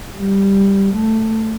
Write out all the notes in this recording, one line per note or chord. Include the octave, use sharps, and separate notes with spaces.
G3
A3